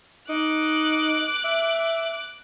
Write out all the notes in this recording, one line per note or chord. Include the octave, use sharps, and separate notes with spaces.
D#4 D6 F#6
E5